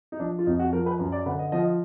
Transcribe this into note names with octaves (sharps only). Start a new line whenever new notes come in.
D#4
F3 D4
F4
F2 D#4
F#4
F3 A#4
B4
F#2
D5
D3 B4
D#5
F3 D#5